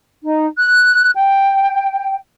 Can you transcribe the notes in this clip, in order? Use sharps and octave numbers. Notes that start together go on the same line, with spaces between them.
D#4
F#6
G5